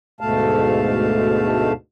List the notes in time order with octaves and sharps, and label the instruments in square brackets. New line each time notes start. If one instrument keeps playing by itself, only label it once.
[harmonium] D2 G#2 B2 A3 F5 A5